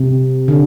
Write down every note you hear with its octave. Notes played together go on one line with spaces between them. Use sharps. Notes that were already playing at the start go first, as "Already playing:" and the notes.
Already playing: C3
D3